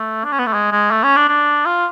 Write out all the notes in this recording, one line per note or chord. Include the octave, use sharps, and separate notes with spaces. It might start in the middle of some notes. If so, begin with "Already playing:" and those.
Already playing: A3
D4
C#4
B3
A3
G#3
G#3
A3
C#4
D4
D4
F4